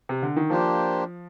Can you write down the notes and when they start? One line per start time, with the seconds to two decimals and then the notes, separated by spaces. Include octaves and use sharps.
0.09 C3
0.22 D3
0.37 D#3
0.50 F3 A#3 D4 G4 C5